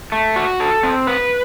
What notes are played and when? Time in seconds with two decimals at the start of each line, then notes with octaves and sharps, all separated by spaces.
0.12 A3
0.36 F#4
0.60 A4
0.83 C4
1.07 B4